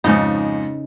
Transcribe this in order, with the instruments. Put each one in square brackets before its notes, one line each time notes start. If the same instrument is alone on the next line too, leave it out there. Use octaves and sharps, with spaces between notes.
[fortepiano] F2 G#2 [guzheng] C#3 D#4